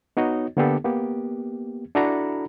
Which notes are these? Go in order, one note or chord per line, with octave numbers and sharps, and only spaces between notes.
B3 D#4 F#4 C#5 D#5
D3 A#3 B3 D4 G4 A4
A#3 B3 G4
D4 E4 F#4 A4 A#5 B5